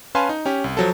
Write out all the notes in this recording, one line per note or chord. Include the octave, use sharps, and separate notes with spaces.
C#4 B4 F5 G#5 A5 C6
D#4
C#4 G4
C2
F3 F#3 A4